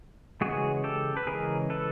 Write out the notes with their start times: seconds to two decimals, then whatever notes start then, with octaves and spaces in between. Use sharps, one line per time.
0.41 C#3 E3 G#3 F#4 G#4
0.84 G4 A4
1.17 B4
1.27 C#3 E3 G#3 G#4 A#4
1.70 A4 B4